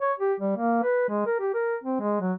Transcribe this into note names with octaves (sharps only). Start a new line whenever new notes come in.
C#5
G4
G3
A#3
B4
G#3
A#4
G4
A#4
C4
G#3
F#3